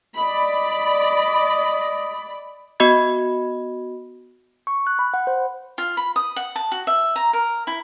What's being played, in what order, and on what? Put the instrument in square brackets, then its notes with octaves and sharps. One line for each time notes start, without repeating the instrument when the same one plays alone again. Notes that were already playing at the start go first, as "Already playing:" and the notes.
[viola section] D5 B5 [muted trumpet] D#5
[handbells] B3 F#4 D#5 B5 G#6
C#6
F#6
B5
F#5
C5
[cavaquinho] F4
B5
D#6
F#5
A5
F#4
E5
A#5
A#4
E4